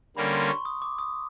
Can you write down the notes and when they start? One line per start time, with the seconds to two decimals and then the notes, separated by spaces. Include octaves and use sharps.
0.16 D3 G3 A#3 C#4 B5
0.33 C6
0.49 C#6
0.65 D#6
0.82 D6
0.99 D#6